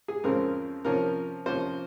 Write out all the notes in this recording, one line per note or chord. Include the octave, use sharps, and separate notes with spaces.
G#4
F2 C#3 F3 G#3 C4 A#4
C3 F3 A#3 C#4 A#4
C3 F3 A#3 C#4 C5